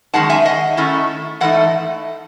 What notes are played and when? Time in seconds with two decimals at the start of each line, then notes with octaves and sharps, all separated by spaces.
0.14 F#2 D#3 G#3 D#4 F#5 A5
0.30 E5 G#5
0.45 D#5 F#5
0.77 D#3 A3 C#4 E4
1.41 G#2 E3 A3 D#4 F#5